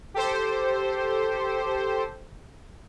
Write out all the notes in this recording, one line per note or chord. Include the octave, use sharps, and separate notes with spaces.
G4 A4 C5